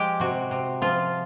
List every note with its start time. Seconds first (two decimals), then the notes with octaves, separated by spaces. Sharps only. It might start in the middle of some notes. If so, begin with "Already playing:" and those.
Already playing: F3 G#3 G4
0.20 C3 F#4
0.51 C3
0.82 F3 F4